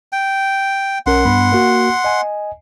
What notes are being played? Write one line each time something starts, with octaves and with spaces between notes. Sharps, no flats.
G5
B1 C#4 A#4 F#5 C6
G2 B3 B5
A#3 F#4
D#5 G#5